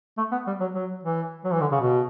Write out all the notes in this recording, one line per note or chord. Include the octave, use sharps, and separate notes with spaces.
A3
B3
G3
F#3
F#3
E3
F#3
E3
D3
C#3
B2